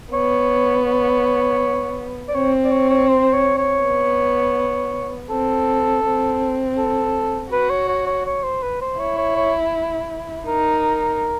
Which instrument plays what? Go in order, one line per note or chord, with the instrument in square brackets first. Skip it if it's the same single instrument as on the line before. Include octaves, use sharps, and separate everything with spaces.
[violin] B3 [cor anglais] C#5
[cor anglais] C#5
D5
[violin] C4 [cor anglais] C#5
[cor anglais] D5
C#5
C#5
C5
C#5
C#5
[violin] B3
[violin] C4 [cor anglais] A4
[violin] C4
[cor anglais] A4
[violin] F#4 [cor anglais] B4
[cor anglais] C#5
C#5
C#5
C#5
C5
B4
C5
[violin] E4 [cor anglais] C#5
[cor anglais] C#5
C#5
[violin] D#4 [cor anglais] A#4